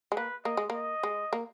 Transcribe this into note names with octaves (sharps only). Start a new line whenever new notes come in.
G#3
A#3 B4
A#3 D#5
G#3
A#3 D#5
G#3
A#3